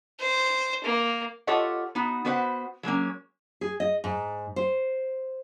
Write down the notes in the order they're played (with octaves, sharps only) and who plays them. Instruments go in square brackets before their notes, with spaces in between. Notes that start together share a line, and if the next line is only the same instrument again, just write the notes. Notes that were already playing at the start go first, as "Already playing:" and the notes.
[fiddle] C5
A#3
[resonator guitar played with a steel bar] F4 G4 A4 C#5 D#5 F#5
B3 D#4 F#4
B3 F#4 B4 C5 F5 F#5
F#3 G#3 A#3 C#4
[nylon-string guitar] G#4
D#5
G#2
C5